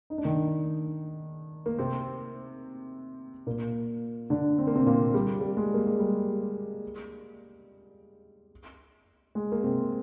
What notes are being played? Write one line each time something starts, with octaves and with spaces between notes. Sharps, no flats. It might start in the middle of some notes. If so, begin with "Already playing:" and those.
D#4
D4
D#3 D#4
A#3
C3 C4
A#2 A#3
D3 D4
C4
A#3
C3 C4
A#2 A#3
G3
G3
G#3
A#3
G#3
G3
G#3
A#3
C3 C4